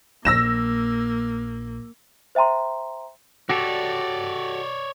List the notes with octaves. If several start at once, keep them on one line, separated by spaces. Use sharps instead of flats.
A#1 A#3 E6 A#6 E7
C5 E5 G5 A#5 C6
F#4 G4 A4 C#5 D5